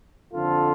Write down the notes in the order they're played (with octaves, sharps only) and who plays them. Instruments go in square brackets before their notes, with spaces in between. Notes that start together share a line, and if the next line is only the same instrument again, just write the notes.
[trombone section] F2 D3 F3 F4 A4